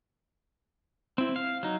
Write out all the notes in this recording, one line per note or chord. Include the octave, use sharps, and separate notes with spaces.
C4 E4
F5
F#3 D#4